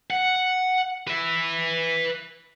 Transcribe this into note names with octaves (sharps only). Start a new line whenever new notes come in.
F#5
B4 E5